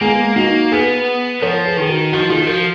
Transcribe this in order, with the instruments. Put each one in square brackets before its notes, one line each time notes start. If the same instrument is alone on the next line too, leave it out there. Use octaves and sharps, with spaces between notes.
[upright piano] G#3 B3 [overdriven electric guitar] A#3
[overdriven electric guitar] A#3 [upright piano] D#4 F#4
[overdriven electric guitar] B3 [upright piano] G#4 B4
[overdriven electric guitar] F3 [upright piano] A#4 C#5
[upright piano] G#4 B4
[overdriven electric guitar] D#3 [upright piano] G#4
[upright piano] F#4 A#4
[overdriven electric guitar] F3 [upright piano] D#4 F#4
[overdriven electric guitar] D#3 [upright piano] F4 G#4
[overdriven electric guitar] F3 [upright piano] F#4 A#4